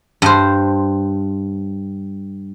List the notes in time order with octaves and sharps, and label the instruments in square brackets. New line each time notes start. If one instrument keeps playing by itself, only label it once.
[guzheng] G2 C5